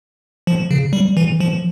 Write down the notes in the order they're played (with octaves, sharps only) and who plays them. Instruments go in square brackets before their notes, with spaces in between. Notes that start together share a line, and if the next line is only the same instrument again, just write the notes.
[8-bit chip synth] F3
C#3
G3
E3
F3